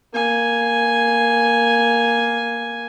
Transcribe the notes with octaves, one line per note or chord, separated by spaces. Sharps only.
A#3 G#5